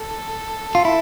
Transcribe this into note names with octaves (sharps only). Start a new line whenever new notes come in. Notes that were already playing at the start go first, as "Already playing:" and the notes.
Already playing: A4
F4
E4